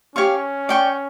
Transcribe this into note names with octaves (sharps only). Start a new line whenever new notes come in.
C#4 G4 C#5 F5 C#6
D5 G5 C#6